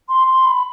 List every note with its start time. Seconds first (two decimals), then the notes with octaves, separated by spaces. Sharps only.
0.08 C6
0.27 C6
0.45 B5